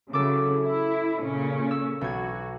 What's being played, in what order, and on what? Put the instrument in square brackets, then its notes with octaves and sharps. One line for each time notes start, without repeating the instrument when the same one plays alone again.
[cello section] C#3 F#3 E4 [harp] A4 D6
[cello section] E4
A#2 C#3 C#4
[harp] E6
[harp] B1 G#6 [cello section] F#4